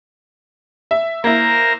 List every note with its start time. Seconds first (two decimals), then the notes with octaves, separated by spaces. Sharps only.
0.91 E5
1.24 A#3 E4 A#4 C5 A#6